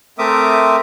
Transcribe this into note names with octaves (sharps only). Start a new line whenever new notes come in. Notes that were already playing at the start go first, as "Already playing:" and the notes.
A3 C4 A#4 E5 D6 D#6